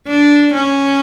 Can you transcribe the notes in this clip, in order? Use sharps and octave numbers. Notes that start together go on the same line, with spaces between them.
D4
C#4